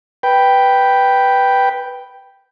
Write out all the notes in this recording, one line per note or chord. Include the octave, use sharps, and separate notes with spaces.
B4 G5